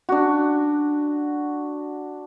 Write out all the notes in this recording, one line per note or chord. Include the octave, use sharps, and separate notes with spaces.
D4 F#4